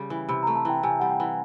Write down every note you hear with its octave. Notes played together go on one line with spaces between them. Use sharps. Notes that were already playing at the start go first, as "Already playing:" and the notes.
Already playing: C#3 G3
E3
C3 B5
A3 A#5
A5
E3 G5
C3 G#5
G3 F#5
G5
E3